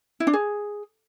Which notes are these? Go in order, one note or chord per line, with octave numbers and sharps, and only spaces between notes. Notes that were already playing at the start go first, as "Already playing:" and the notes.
E4
D4
G#4